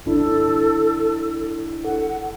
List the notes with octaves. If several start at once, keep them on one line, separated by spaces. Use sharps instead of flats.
G1 D4 E4 A4
A4 F#5